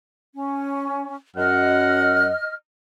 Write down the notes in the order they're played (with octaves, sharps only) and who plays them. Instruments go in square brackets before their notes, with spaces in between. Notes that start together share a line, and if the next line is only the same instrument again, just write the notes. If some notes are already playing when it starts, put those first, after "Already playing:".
[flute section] C#4
[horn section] F#2 F#5 [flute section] D#5 F6